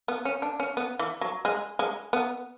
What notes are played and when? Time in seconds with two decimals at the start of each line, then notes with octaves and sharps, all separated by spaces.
0.08 B3
0.25 C#4
0.42 D4
0.60 C#4
0.77 B3
0.99 E3
1.21 F#3
1.45 G#3
1.79 G#3
2.13 B3